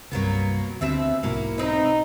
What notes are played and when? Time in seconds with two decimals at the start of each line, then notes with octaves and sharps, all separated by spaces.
0.12 C2 G2 F#3 A#3 B3
0.81 D2 B2 C4 E5
1.23 B1 G#2 A#3 E4 F#4
1.58 C4 D#4 B4